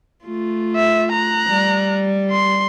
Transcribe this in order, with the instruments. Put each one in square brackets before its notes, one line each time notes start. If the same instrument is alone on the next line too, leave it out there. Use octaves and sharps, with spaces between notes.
[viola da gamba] A3 F4
[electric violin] E5
A#5 F#6
[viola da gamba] G3
[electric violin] C6